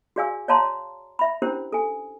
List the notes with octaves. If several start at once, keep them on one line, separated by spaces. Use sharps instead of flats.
F#4 G#4 D5 F5 G#5 E6
C#5 D5 F5 A5 A#5 C6
E5 B5
C#4 D4 E4 G4 A#4 C5
A4 G#5